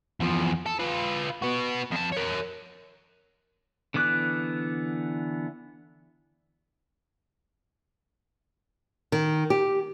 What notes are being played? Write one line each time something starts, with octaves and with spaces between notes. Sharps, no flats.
E2 F3
A4
F4 B4
B3 F#4
F2 A5
A#4 C#5
D3 E3 B3 D6 F#6
D#3
G4